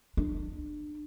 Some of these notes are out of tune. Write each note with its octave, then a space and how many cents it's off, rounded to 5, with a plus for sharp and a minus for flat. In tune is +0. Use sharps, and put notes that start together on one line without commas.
D4 +30